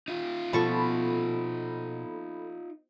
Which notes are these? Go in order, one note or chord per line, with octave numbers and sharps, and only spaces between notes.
D#4 F4
B2 F3 A4 A5 B5 C#6